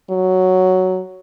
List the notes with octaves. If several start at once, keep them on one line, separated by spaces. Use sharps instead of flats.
F#3